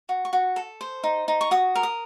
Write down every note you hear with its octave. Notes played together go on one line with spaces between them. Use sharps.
F#4
C#6
F#4
A4
C5
D#4
D#4
C#6
F#4 D#6
A#4
D#6